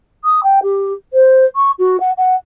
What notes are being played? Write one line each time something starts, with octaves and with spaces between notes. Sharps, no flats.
D#6
G5
G4
C5
C#6
F#4
F#5
F#5